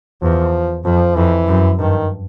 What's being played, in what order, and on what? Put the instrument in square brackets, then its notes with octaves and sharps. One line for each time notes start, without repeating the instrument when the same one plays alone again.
[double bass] E2 [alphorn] F3
[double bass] F2 [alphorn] F3
[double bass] F2 [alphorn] E3
[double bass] F#2
[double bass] G2 [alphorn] D#3